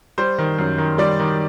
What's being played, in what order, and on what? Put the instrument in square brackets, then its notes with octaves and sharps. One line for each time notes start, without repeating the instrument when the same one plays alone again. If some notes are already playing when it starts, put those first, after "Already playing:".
[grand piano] G3 C5
D#3
F#2
D#3
G3 D5
D#3